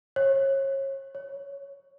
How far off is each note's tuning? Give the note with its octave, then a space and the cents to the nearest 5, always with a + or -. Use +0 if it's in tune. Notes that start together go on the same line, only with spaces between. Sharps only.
C#5 -30
C#5 +10